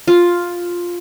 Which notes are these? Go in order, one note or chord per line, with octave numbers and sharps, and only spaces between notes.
F4